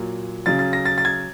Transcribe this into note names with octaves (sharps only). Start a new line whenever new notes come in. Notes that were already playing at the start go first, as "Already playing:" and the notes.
Already playing: A#2 F#3
C#3 F#3 A6
A6
A#6
A6
A6
G#6